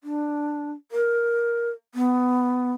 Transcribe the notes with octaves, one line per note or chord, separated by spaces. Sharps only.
D4
A#4
B3